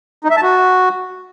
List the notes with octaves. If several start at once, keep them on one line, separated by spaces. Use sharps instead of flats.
D#4
E5
A5
F#4